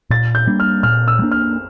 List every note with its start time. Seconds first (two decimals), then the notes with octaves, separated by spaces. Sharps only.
0.10 A#2 A6
0.35 G6
0.47 G3 A#3 D4
0.60 F6
0.83 A#2 F6
1.08 E6
1.19 G3
1.22 A#3 D4
1.32 F6